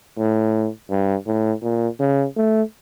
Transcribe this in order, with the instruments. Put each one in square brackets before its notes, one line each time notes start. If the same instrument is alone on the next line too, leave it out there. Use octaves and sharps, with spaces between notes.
[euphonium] A2
G2
A2
A#2
C#3
A3